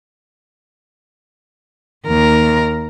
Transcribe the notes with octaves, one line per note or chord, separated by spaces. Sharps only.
D#2 A#4